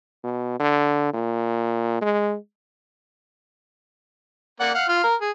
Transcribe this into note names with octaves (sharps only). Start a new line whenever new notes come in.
B2
D3
A#2
G#3
A#3 D5 F#5
F5 F#5
F4 F5
A#4
G#4